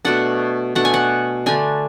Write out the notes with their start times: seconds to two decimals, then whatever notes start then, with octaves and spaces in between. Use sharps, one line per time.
0.05 B2 A3 D4 F#5
0.75 B2 A3 D4 F#5
0.85 G#5
0.94 F#5
1.46 D3 A3 D4 G#5